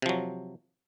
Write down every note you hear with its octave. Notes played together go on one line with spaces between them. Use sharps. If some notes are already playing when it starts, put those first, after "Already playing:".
C3 F3 F#3